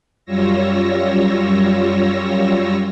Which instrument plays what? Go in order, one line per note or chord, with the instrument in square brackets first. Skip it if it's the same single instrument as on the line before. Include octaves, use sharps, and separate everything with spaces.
[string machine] F#2 G3 F4 C#5 E6 A#6